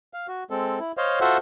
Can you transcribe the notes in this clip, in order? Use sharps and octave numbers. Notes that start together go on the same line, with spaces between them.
F5
F#4
G#3 C4 A4
E4
C5 C#5 D#5 F5
F4 F#4 A4 C5 E5 F#5